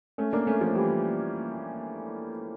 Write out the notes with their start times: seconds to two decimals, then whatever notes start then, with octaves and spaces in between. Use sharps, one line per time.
0.18 A3 C#4
0.33 A#3 D4
0.47 A3 C#4
0.61 F3 A3
0.75 E3 G3